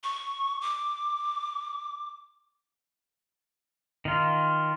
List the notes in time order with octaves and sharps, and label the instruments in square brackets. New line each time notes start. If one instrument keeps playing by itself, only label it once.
[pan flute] C#6
D6
[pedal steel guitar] D#3 F4